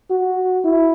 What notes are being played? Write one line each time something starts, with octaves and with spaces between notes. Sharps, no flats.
F#4
E4